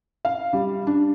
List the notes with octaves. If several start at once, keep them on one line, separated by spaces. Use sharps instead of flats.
F5
G3
D4